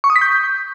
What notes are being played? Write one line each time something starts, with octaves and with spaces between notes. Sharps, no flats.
C#6
D#6
B6
G6